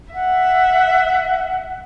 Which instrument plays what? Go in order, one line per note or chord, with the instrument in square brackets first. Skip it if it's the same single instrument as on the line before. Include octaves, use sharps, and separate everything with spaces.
[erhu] E5 [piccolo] F#5